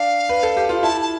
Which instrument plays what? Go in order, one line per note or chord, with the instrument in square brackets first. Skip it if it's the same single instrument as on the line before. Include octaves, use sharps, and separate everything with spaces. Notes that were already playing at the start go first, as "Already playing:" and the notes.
Already playing: [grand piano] D4 [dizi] F5
[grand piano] B4
A4
G4
F4
[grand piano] E4 [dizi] A5
[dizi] A5